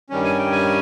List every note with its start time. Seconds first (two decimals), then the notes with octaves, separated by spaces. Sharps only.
0.10 G2 D#3 G3 C#4
0.24 G#5
0.38 G5
0.52 G#5